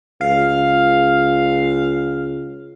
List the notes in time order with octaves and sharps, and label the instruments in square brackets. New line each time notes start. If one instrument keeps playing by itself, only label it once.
[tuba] C#2 [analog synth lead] F5